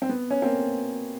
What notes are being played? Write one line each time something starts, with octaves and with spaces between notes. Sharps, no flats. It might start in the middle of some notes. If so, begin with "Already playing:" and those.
C4
B3
C#4
A#3 C4